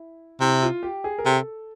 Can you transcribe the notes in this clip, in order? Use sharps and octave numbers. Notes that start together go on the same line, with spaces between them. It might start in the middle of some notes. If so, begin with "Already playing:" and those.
Already playing: E4
C3 E4
F4
G4
G#4
A#4
C3 A4